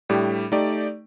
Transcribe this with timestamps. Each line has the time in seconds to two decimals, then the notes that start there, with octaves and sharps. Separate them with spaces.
0.09 A2 G3 D4 G4
0.52 A3 D#4 G4 D5